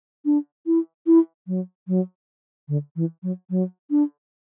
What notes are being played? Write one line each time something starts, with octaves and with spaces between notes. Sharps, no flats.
D4
E4
E4
F#3
F#3
D3
E3
F#3
F#3
D4